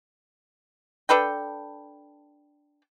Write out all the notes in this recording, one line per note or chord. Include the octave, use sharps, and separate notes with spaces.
D4 A4 B4 G5